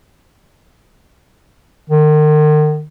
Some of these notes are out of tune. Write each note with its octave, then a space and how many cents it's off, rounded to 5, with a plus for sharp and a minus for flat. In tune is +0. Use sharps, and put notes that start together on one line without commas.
D#3 -40